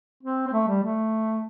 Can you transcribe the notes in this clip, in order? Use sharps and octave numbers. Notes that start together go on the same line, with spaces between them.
C4
C4
A3
G3
A3